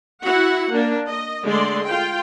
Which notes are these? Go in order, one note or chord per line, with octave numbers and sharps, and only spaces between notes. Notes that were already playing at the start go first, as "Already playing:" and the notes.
E4 F#4 F#5
A#3 D4
D#5
D3 G#3 A3 D5 C6
F4 G5